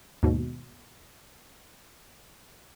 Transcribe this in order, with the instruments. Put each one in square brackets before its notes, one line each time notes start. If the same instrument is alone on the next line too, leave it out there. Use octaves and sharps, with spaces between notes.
[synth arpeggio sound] D#2 G#2 B2